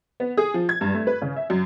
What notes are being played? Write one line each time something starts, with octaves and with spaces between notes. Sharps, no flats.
B3
G#4
F3
G#6
G2
A3
B4
C#3
E5
F#2